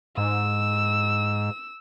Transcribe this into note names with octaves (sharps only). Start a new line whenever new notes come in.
G#2 E6